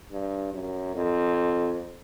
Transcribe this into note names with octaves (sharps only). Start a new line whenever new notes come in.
G2
F#2
F2